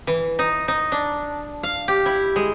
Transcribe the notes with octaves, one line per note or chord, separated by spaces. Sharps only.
E3
D#4
D#4
D4
F5
G4
E4
G#3